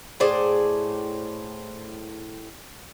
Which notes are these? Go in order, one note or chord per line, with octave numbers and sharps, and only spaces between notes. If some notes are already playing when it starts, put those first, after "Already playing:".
A2 G#4 C5 D5